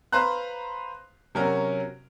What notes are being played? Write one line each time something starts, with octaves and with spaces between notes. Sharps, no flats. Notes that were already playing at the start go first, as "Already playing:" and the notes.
B4 C5 F5 A#5 C6 F#6
C3 F#3 C#4 F#4 A#4